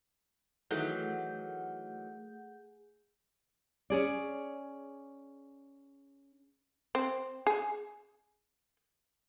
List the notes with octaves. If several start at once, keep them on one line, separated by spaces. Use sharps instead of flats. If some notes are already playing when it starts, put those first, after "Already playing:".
D#3 E3 F#3 A3 G#4 F#5 G6
C#4 G#4 D5
C4
G#4